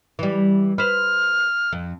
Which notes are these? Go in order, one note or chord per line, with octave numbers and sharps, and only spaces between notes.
E3 G3
B4 C5 F6
F2